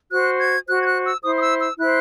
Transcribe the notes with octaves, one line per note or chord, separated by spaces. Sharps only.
F#4 C5 F#6
G#6
F#4 C5 F#6
G#6
F#6
E6
E4 C5 D#6
D#6
E6
E6
E4 C5 F#6